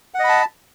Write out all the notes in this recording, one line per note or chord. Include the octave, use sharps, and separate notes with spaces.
D#5 F#5 A5 B5